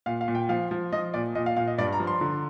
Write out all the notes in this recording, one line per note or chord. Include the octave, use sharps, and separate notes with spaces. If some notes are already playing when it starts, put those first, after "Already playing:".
A#2 F5
F5
A#2
G5
F3 F5
F3
F3 D#5
A#2 D5
A#2 D#5
F5
A#2 F5
D#5
G2 D5
A#5
F3
C6
D3